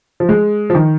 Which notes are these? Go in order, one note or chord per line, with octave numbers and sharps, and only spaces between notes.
F3
G#3
F3
D#3